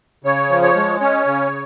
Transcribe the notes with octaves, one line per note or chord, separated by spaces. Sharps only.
C#3 C#5
F3
C#5
G#3
C#4 C#5
C#3